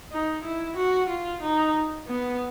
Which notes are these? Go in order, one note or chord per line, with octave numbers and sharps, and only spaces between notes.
D#4
E4
F#4
F4
D#4
B3